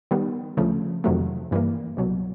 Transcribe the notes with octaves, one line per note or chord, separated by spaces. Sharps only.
D#3 G3 B3
D2 C#3 F3 A3
F2 C3 D#3 F#3 A3
G2 E3 G3 A#3
C2 B2 F#3